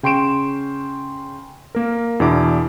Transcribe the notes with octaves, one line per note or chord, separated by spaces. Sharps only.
C#3 G5 C6 C#6 D7 E7
A#3 A#4
E2 B2 B3 D4 E4 D6